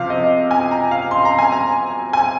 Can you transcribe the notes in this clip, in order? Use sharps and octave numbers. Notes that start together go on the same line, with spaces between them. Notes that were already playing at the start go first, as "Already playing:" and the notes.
Already playing: C3 F3 C4 F4 F5
D#5
G#5
A#5
F5
C6
A#5
G#5
A#5
G#5